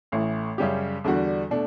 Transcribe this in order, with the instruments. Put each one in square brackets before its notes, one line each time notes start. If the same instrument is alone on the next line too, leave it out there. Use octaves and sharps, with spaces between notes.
[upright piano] A1 A2 E3
F#2 C#3 G3 C#4 G4
E2 D3 G3 D4 F#4
B2 A3 D4